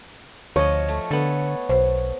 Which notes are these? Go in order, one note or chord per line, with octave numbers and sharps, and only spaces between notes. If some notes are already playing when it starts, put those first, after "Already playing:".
D2 F3 C#5 D#5
A3
D3 B3 A4
B1 C5